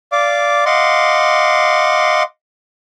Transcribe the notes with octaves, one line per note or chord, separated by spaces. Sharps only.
D5 F5 D6
D#5 F5 F#5 C6 D6